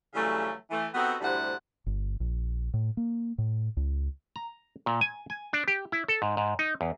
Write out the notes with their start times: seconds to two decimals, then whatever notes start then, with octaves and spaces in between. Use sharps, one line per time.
0.14 C#3 E3 F#3 G3 A3
0.70 E3 A3
0.94 B3 C4 D#4 F#4 G4 A4
1.21 D2 A2 C3 G3 C5 F#5
1.86 G1
2.20 A#1
2.74 A2
2.97 A#3
3.38 A2
3.77 C#2
4.36 A#5
4.86 A#2
5.01 G#5
5.30 G#5
5.53 D4
5.68 G4
5.92 E4
6.08 A4
6.22 G#2
6.37 G#2
6.59 D#4
6.81 E2